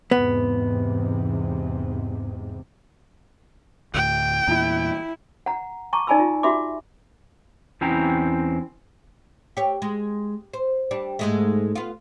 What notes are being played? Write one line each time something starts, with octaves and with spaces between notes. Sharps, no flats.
E2 G#2 C3 B3
D2 A2 G5
E2 A#2 E4
F#5 A#5
A5 A#5 C#6 D6
D#4 D5 G#5 A5 B5 E6
F4
F#4 G4 E5 B5 D6
E2 C4 C#4 E4 G5 A#5
G4 C#5
G#3
C5
G3 D4
G#2 G#3 A3
B3 F4